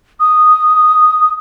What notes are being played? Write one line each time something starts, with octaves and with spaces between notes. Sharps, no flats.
D#6